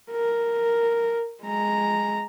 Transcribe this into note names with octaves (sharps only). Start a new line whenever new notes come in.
A#4
G#3 A#5